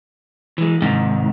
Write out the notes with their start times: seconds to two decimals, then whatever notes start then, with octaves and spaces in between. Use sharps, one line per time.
0.58 E3 G#3
0.82 G#2 C3 D#3